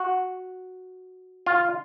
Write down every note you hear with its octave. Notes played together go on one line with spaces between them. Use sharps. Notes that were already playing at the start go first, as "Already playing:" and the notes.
Already playing: F#4
F4